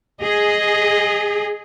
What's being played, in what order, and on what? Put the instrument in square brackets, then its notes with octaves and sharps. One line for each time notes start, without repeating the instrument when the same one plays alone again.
[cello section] G#4 [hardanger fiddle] D#5